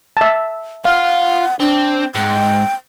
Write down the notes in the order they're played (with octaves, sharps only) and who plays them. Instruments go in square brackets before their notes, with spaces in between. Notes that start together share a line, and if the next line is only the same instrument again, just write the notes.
[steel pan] E5 A5
[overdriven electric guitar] F4 [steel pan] F5 [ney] F#5
[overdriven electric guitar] C4 [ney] D4
[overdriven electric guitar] G#2 [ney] G5